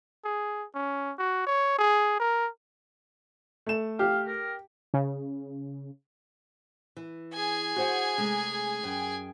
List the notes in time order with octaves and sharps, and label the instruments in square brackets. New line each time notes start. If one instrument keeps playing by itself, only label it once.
[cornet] G#4
C#4
F#4
C#5
G#4
A#4
[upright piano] A3 E7
[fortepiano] G4 [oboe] F5
[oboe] A#4
[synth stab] C#3
[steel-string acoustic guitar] E3
[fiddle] G#4 G#5
[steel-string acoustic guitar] F#4 C5 F#5
C3 G#3 A3
F#2 G5